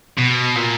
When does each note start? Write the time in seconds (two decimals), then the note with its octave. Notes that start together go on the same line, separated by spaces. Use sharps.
0.18 B2
0.56 A#2